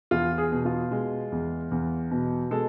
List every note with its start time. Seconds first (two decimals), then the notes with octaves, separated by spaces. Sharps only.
0.11 E2 F4
0.38 G#4
0.51 B2
0.65 F4
0.91 G#3
1.32 E2
1.71 E2
2.11 B2
2.51 G#3 A4